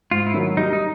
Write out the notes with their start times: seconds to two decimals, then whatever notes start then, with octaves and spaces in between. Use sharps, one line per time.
0.11 G#2 F4
0.26 E4
0.34 D#3 F#3
0.57 G3 D#4
0.73 D#4